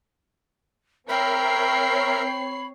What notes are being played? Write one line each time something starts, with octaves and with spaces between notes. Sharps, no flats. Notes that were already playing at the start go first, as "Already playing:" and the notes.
C4 A#4 C#5 E5 G5 A#5 B5 C7